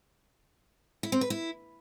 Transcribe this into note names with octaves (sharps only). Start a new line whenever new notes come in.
E4
C4
B4
E4